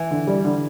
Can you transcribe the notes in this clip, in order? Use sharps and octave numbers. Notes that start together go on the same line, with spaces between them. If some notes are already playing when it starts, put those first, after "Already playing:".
Already playing: E3
D3
G3
D3